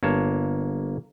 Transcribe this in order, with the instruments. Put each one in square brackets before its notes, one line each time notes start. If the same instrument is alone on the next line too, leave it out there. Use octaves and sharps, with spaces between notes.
[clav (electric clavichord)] G1 A#3 C#5 A5